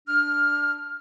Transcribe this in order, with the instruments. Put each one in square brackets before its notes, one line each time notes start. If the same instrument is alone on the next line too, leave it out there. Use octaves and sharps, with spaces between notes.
[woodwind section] D4 F6